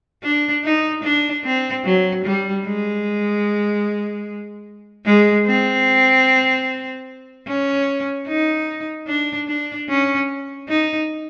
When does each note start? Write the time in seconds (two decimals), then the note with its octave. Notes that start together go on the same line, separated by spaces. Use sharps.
0.23 D4
0.64 D#4
1.04 D4
1.44 C4
1.84 F#3
2.24 G3
2.65 G#3
5.05 G#3
5.47 C4
7.47 C#4
8.28 D#4
9.07 D4
9.47 D4
9.89 C#4
10.68 D#4